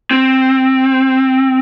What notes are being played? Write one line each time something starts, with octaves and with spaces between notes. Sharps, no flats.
C4